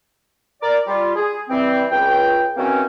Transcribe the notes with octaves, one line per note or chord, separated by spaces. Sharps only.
A#4 D5
G3 F4
G#4
E3 G3 C4
C#2 G5
D#3 E3 F#3 A#3 C4 C#4